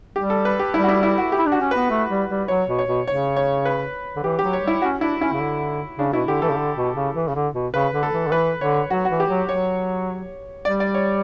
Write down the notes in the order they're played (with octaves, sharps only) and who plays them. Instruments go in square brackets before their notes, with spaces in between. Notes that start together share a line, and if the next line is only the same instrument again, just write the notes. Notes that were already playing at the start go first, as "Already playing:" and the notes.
[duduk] G3 [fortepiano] G4
[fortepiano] A4
B4
G4
[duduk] G3 [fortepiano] E4
[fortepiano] F#4
E4
E4
F#4
G4
[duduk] E4
D4
[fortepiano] F#4
[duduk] C#4
[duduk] B3 [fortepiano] B4
[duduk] A3
G3
G3
[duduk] F#3 [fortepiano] C#5
[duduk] B2
[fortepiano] C#5
[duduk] B2
[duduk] C#3 [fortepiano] C#5
[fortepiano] C#5
B4
[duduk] D3
[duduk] E3 [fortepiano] G4
[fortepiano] G4
[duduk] F#3
[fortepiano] C#5
[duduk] G3 [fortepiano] E4
[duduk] C#4 [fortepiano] F#4
[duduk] D4 [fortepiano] E4
[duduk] C#4 [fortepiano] E4
[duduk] C#3
D3
[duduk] C#3 [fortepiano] D4
[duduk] B2 [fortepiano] E4
[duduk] D3 [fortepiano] G4
[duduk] E3 [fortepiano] A4
[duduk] C#3
D3
B2
C#3
E3
C#3
D3
B2
[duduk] C#3 [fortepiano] B4
[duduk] D3
[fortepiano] A4
[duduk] E3
D3
[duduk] E3 [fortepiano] B4
[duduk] D3 [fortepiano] C#5
[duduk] F#3 [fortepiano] F#4
[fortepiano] F#4
[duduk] E3
[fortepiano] G4
[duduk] F#3
[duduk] F#3 [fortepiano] C#5
[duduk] G3 [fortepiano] D5
[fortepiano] D5
C#5